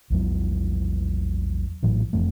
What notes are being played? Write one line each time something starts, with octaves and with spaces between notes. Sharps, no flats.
A#1 E2 F#3
A#1 A2 E3 F#3
F1 F2 E3 A3